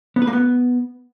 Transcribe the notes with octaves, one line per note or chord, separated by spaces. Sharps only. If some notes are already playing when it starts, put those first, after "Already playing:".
B3
B4
A#3
B3